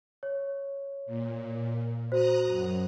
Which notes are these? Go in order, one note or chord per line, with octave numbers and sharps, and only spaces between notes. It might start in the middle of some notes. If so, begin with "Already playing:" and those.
C#5
A#2
F#4 C5 A#5 D#6 F#6
F#2